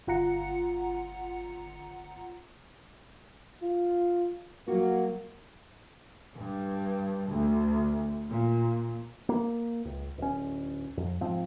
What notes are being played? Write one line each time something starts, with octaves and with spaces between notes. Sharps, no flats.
G1 F4 F#5 A#5 C#7
F4
F#3 A#3 F#4
G2
D2
A#2
A#3
C#2
D1 C#4
F2
G#2 F3 C4